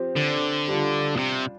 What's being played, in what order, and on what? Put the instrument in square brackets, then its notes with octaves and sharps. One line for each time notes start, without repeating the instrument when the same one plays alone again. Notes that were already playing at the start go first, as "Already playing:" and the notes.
Already playing: [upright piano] F3 C4 G4
[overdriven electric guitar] D3
[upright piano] G3 D4 F4
[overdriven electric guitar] A#2
C3